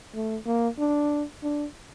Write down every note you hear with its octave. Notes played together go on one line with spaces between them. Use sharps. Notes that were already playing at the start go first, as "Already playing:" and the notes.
A3
A#3
D4
D4